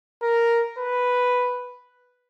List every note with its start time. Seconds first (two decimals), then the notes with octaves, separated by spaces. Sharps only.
0.22 A#4
0.78 B4